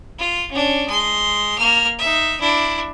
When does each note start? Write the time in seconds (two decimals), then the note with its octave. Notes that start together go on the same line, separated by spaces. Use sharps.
0.19 F4
0.51 C#4 D4
0.88 G#3 C6
1.58 A#3 F6
1.98 D#4 E5
2.40 D4 E4